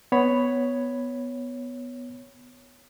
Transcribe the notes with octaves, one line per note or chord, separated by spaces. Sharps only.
B3 C#5 B5